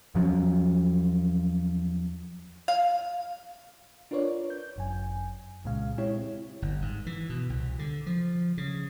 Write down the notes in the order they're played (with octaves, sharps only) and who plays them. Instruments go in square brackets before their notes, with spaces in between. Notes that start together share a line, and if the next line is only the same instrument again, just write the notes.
[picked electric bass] E2 F3 F#3 C#4
[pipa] F5
[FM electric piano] D4 F4 A#4 B4 C#5 D5
G6
G1 F#2 G#5
C2 A#2 C#3 G#3 F5
G#3 C4 E4 G4 C#5
[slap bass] G1
G#2
E3
B2
C2
D3
F3
C#3